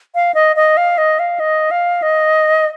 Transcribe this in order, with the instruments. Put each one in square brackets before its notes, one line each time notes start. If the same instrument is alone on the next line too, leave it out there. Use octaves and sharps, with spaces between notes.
[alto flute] F5
D#5
D#5
F5
D#5
F5
D#5
F5
D#5